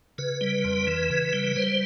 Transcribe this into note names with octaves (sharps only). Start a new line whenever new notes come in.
C#3 B4
G3
F2
E3
C#3
G3
G3 C5